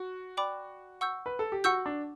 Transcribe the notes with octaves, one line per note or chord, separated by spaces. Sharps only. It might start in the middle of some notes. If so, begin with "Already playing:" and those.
Already playing: F#4
D5 G5 B5 D6
F#5 C#6 E6 G6
B4
A4
G4
F#4 F#5 C#6 E6 G6
D4